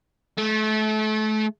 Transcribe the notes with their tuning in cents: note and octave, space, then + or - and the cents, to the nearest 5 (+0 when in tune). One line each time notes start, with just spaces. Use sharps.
A3 -30